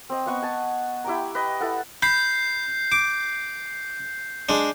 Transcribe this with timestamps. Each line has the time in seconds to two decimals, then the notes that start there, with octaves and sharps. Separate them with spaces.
0.09 C4 D#5
0.26 B3 D#5 F#5 C#6
0.42 G#5 A5
1.04 E4 G4 G5 A#5
1.35 B4 D#5
1.60 E4 A4 F#5
2.02 B5 G6 C7
2.92 D6
4.49 G#3 D4